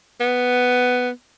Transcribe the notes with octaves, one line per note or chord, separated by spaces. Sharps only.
B3